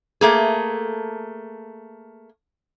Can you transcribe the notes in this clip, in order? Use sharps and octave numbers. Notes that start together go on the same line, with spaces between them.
A3 A#3 G#4